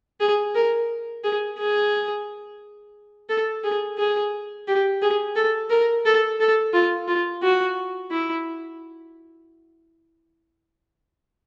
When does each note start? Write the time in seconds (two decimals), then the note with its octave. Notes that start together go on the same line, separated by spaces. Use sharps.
0.20 G#4
0.55 A#4
1.24 G#4
1.58 G#4
3.29 A4
3.64 G#4
3.98 G#4
4.67 G4
5.02 G#4
5.36 A4
5.70 A#4
6.05 A4
6.40 A4
6.74 F4
7.08 F4
7.42 F#4
8.11 E4